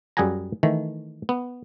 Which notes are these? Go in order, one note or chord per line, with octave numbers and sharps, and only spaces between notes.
F#2 G3 G#4 F#5 G#5 A#5
D#3 E3 A3
B3